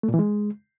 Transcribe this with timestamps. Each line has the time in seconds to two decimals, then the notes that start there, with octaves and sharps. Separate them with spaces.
0.03 A3
0.09 A#2
0.14 E3
0.19 G#3